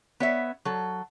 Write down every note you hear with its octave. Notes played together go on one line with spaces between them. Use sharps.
B3 C#5 E5
F#3 A4